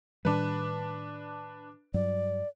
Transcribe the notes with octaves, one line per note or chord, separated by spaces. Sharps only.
A2 D#3 G3 D4 B4
G2 F#3 D5